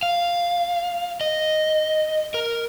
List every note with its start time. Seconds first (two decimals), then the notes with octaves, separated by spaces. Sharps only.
0.03 F5
1.21 D#5
2.34 A#4